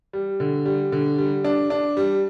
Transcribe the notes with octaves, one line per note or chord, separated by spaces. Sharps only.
G3
D3
G3
D3
G3
D4
D4
G3